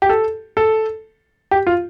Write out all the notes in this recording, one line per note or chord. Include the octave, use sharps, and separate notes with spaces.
G4
A4
A4
G4
F4